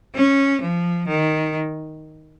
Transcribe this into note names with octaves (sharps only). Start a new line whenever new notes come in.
C#4
F3
D#3